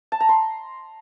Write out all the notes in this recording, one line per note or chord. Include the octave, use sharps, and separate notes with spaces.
A5
A#5
C6